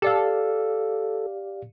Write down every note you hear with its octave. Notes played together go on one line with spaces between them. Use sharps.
G4 A4 D5 F5